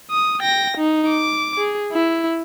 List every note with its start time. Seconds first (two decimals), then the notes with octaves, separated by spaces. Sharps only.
0.11 D#6
0.41 G5 A#6
0.77 D#4
1.09 D6
1.58 G#4
1.92 E4